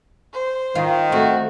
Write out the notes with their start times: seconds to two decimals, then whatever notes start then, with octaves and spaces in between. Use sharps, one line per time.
0.33 C5
0.75 D#3 F4
1.12 A3 C4 F#4